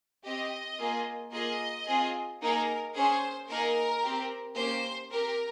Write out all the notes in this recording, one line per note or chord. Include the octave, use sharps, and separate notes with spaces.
C4 G4 D#5
A#3 F4 G#4
A#3 F4 G#4 D#5
C4 F4 G#4
A#3 D#4 G#4 A#4
C#4 G#4 C5
A#3 D#4 G#4 A#4
C4 G4
A#3 C#4 G4 C5
C4 G4 A#4